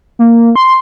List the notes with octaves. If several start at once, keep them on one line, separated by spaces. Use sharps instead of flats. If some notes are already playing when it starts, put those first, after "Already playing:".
A#3
C6